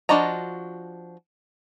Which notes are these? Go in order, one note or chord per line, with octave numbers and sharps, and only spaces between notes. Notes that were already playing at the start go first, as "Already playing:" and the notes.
F3 D4 F#4 D#5 A#5